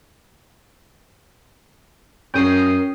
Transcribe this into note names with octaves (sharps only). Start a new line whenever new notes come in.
F#2 C#4 A#4 G5 D#6 C7